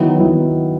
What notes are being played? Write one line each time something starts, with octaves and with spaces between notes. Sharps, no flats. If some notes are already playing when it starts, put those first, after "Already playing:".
Already playing: D#3 F#3 B3 E4
D#3 F#3 B3 E4